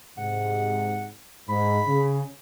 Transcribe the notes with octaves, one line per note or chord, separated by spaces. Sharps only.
G#2 C3 F#5
G#2 B5
C#3